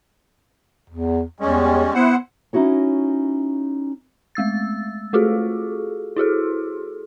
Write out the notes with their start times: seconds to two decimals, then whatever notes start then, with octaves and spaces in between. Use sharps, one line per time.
0.90 E2
1.40 E2 G3 G#3 C#4
1.94 B3 E4 C5 F#5
2.53 C#4 D#4 E4 F#4 C#5
4.35 G#3 A3 E6 A6
5.13 A3 F4 F#4 G#4 A4
6.16 E4 F#4 G#4 A4